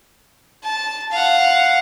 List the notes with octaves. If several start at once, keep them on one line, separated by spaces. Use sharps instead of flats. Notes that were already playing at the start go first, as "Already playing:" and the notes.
A5
F5 F#5